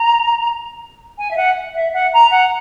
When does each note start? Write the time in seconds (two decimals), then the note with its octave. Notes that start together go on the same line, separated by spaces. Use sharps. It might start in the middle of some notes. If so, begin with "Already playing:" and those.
Already playing: A#5
1.18 G#5
1.31 E5
1.37 F#5
1.75 E5
1.94 F#5
2.13 A#5
2.31 F#5